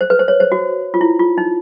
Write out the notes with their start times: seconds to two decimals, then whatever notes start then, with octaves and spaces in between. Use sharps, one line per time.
0.01 C5
0.10 B4
0.19 C5
0.28 C#5
0.40 C5
0.52 F#4
0.94 F4
1.01 E4
1.19 F4
1.38 D#4